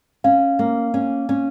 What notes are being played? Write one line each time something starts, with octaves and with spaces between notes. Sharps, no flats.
C#4 F5
A#3
C#4
C#4